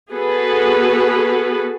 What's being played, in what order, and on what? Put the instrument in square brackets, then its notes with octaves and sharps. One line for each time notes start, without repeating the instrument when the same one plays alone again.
[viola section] B3 F#4 G#4 A4 B4